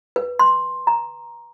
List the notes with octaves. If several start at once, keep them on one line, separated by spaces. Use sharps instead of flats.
B4
C6
A#5